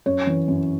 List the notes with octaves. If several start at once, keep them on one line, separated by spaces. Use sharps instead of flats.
F#2 C#5
E3
F#2